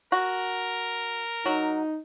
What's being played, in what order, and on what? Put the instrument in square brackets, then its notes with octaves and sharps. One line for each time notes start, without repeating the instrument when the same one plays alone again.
[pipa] F#4 [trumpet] A#4
[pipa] F#3 [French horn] D#4